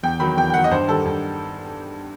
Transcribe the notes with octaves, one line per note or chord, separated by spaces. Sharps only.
E2 G5
D#3 F#3 B5
E2 G5
G5
D#3 F#3 F#5
D#5
G2 C5
D#3 G3 A4
G2